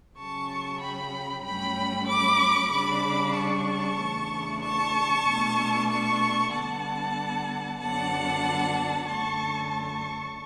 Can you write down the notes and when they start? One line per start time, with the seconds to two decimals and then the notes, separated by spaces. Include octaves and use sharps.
0.18 C#3 F#3 C#4 A5 C#6
0.82 G5 B5
1.45 G2 F#3 A3 C#4 G5 B5
2.09 B5 D6
2.72 C#3 G3 D4 B5 D6
3.35 A5 C#6
3.99 E2 C#3 E3 A3 D4
4.62 A5 C#6
5.26 B2 A3 D4
5.89 A5 C#6
6.53 D3 G3 B3 D4 F#5 A5
7.80 F#2 D3 F#3 B3 D4 F#5 A5
9.07 F#2 D3 A3 A5 C#6
9.71 A5 C#6